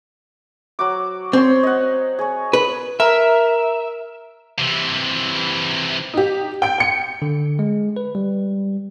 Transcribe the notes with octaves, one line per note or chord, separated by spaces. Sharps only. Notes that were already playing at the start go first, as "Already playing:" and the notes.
F#3 F#4 D6
C4 C5 C#5
D#5 F#5
G#4 C#5
B4
A#4 E5
C3 E3
D#4 G4
G5 D7
G5 C#7
D3
G#3
B4
G3